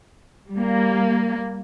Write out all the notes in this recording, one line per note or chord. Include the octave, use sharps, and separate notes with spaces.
G3 A#3